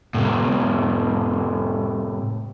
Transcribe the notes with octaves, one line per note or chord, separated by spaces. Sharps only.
A2 C3